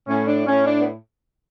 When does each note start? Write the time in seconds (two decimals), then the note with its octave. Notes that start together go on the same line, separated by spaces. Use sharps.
0.08 A2 C#4
0.27 D4
0.46 A2 C#4
0.66 D4
0.80 B3